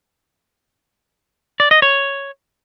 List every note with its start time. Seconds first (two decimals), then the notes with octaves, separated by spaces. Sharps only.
1.60 D5
1.71 D#5
1.82 C#5